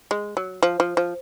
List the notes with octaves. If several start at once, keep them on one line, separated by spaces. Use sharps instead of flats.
G#3
F#3
F3
F3
F3